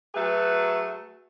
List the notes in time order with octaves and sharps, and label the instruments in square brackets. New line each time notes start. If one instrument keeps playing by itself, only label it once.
[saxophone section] F#3 A3 G#4 B4